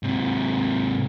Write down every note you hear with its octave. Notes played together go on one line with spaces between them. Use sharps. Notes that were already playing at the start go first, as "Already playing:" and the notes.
G#2 C3